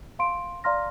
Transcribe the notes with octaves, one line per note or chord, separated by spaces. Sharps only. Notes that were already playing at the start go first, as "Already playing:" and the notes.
F5 C6 D7
D5 F5 A#5 C6 F6 A#6